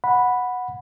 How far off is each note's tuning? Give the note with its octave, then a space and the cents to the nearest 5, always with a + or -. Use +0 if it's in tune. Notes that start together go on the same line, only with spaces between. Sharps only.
F#5 -10 B5 +0